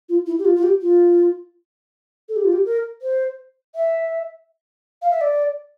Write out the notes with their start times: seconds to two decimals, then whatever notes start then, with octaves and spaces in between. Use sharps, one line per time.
0.08 F4
0.26 E4
0.38 G4
0.44 F4
0.56 F4
0.62 G4
0.81 F4
2.28 A4
2.35 G4
2.44 F4
2.52 G4
2.65 A#4
3.01 C5
3.75 E5
5.01 F5
5.11 E5
5.20 D5